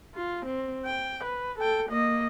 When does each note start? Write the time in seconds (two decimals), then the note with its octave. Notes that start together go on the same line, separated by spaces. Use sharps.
0.15 F4
0.46 C4
0.86 G5
1.24 B4
1.59 A4 G5
1.90 A#3 D#5